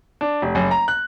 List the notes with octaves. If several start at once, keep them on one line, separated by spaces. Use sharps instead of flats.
D4
F1
F#1
A#5
F#6